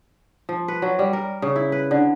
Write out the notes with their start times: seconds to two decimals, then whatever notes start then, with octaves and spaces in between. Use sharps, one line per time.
0.49 F3
0.68 B4
0.82 F#3
0.99 G3
1.13 A#4
1.42 C#3
1.56 E4
1.72 B4
1.91 D3